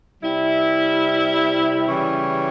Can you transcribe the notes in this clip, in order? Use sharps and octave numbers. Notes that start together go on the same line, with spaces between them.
C3 G3 E4
C#3 E3 G3 C#4